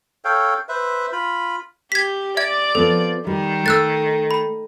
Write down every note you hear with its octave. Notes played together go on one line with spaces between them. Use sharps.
A4 C#5 F5 G5
B4 C5 E5
F4 B5
G4 G#6 B6
D5 E5 G#6
F3 B3 C4 A4
D#3 G3
A3 E6 F#6 A6
B5